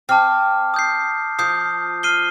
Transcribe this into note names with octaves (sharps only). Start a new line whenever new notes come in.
C4 A5 D6 F6
D#6 G6 C7
F3 D#6 G6 C7
F6 C7 D#7 G7